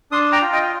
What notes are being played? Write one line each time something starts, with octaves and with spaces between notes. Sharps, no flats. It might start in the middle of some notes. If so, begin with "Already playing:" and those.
D4 C6 D#6
G5 A#5
F4
D#5 G5